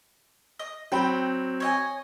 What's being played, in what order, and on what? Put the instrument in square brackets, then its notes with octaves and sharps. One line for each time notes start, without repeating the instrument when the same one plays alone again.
[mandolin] D#5
[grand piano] F#3 C4 [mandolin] G5 B5
[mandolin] C#5 D#5 G#5